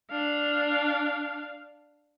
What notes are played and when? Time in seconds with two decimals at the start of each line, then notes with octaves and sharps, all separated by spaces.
0.11 D4 F5